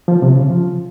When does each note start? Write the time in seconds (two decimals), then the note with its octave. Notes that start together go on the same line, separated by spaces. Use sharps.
0.08 F3
0.22 C3
0.36 C#3
0.50 F3